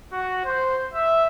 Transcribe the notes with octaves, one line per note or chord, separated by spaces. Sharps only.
F#4
C5
E5